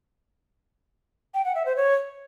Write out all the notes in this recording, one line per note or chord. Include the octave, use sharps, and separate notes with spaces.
G5
F#5
E5
C5
C#5